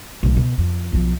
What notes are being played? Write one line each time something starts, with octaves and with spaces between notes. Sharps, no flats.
B1 A2
B2
F2
B1 F3